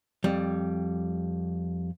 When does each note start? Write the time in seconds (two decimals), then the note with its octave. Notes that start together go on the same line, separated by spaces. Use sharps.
0.24 F2 G3